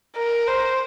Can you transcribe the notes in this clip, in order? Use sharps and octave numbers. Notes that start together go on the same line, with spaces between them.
A#4
C5